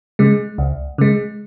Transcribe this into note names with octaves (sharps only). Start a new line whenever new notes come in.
C#3 G#3
C#2
C#3 G#3